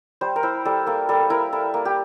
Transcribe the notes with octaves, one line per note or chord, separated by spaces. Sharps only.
G3 C5
A#4
E4 C5
G3 A4
A#3 A4
G3 A4
E4 A#4
E4 A4
A#3
G4